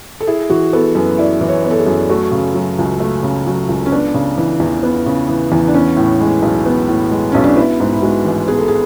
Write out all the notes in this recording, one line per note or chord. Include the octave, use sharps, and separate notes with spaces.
A4
E4 G#4
E3 F#4
B3 A4
F#2 B4
E4 D5
E3
C#5
B3
A4
G#4
F#2
A3 F#4
C#3
F#3
C#2
A3
C#3
F#3
C#2
C#4
B3 D4
C#3
E3
E2
B3
C#3
E3
E2
D4
B3 C#4
A2
G#3
B1
B3
A2
G#3
B1 C#4
D4
B3 E4
G#2
E4
G#3 F#4
A1
B3 G#4
A4
G#4